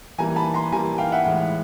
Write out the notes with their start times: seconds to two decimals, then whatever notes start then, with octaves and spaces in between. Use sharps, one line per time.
0.18 E3 G3 A#3 G#5 A#5
0.36 A5 B5
0.54 A#5 C6
0.72 E3 G3 A#3 G#5 A#5
0.98 F5 G5
1.12 E5 F#5
1.26 A2 E3 G#3